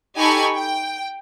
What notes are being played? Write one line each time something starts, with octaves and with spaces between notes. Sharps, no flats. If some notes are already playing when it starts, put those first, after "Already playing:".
D#4 G4 A4 G#5 B5 C#6
G5